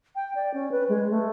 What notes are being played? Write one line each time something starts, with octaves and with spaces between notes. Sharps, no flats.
G5
D5
C#4
B4
G#3
A3